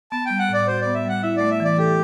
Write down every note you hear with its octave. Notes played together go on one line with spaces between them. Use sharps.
B3 A5
G3 G5
F#5
A2 D5
F#4 C5
B3 D5
E5
G3 F#5
E4 E5
A3 D5
E5
E3 D5
G4 A4